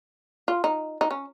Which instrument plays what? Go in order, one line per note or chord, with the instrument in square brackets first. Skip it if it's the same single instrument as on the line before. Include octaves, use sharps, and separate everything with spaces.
[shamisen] F4
D#4
D#4
C#4